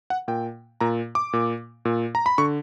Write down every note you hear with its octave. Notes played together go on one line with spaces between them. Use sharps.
F#5
A#2 G5
A#2 A#5
D6
A#2
A#2
A#5
B5
D3 C#6